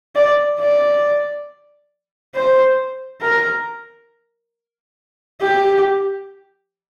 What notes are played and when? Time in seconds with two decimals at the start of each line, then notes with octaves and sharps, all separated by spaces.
0.15 D5
0.60 D5
2.35 C5
3.22 A#4
5.41 G4